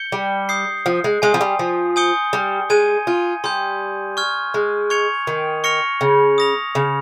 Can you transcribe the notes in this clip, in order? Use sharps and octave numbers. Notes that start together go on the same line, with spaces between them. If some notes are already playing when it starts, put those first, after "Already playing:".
Already playing: G6 C#7 G7
G3
D#6 G6 C7
F3
G#3
G#3 G#5 C6 D#6
F3
G3
F3
G#5 D#6 G6 C#7 G7
G3
G#3 G#5 D#6 G#6 D#7
F4
G3 C6 D#6 G6
C#6 F6 G#6
G#3
C#6 G#6 C#7 F7
D#3
C#6 F6 A#6 C#7 F7
C#3
D#6 A#6 F7
C#3